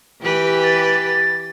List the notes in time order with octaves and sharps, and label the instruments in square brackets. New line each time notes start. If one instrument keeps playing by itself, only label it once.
[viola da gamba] E3 G4 B4
[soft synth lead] A6